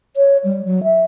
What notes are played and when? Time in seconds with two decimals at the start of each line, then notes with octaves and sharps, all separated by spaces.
0.17 C#5
0.44 G3
0.65 F#3
0.84 E5